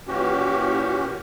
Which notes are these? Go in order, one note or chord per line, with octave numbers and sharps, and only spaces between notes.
A#2 E3 C#4 F#4 G4